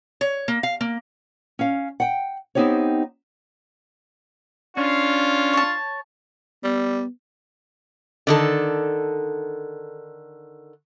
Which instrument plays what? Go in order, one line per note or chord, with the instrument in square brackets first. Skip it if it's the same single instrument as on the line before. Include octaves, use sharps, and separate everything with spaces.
[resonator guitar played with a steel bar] C#5
A#3
F5
A#3
[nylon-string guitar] C#4 F5
F#5 G5
B3 C4 D#4 G4 C5 C#5
[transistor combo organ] C#4 [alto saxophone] D4 [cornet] F4
[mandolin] C#5 A5
[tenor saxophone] G3 [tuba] B3
[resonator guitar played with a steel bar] D3 D#3 A4